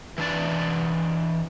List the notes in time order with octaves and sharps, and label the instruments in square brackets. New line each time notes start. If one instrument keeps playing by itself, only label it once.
[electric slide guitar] E3 D4 D5